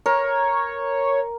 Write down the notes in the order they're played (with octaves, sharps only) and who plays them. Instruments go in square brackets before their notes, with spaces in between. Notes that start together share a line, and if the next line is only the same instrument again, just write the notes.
[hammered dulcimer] A#4 [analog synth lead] C#5